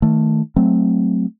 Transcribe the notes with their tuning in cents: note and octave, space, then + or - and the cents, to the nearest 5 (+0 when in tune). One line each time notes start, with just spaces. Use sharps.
D#3 +20 A3 +0
F#3 +0 A3 +0 C4 +0